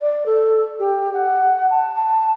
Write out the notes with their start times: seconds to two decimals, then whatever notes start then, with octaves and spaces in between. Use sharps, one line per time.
0.01 D5
0.26 A4
0.79 G4
1.14 F#5
1.70 A5
1.96 A5